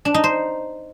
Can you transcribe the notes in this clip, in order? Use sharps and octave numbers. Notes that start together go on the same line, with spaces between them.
D4
D#4
C5